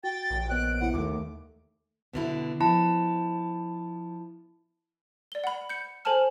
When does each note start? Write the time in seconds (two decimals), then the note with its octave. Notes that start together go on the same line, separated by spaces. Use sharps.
0.04 F#4 G5 A6
0.30 A#1
0.50 B3 C#5 D#5 F#6 D7
0.80 C#3 B3 E4 F#5
0.94 D#2 D#3 A3 D6
2.13 B2 D3 E4
2.60 F3 E4 A5
5.32 D5 G7
5.44 F#5 B5
5.69 G6 C#7
6.05 A4 C5 G#5 A5 F6